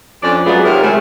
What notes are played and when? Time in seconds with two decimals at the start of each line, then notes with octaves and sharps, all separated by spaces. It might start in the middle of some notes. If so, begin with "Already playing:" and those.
0.23 F2 C#4 D4 D5
0.46 F#3 G#3 A3 B3 F4 G#4
0.64 C3 D#3 F#3 A#4
0.83 G#3 A3 E4